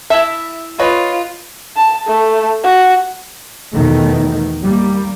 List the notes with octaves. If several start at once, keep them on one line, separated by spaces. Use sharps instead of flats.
E4 E5 A5
F4 B4 C#5 D#5
A5
A3
F#4
E2 B2 D#3 A3
G3 A#3